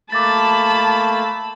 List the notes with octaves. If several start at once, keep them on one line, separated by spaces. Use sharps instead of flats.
A3 A#3 A5 B5 D6 A6